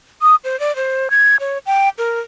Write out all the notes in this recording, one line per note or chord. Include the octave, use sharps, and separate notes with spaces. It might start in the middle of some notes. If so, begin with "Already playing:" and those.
D#6
C5
D5
C5
G#6
C#5
G5
A#4